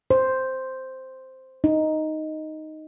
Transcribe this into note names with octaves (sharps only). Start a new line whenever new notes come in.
C5
D#4